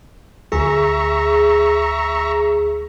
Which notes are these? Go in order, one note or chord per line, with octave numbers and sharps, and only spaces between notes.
D2 G#4 E5 A#5 C#6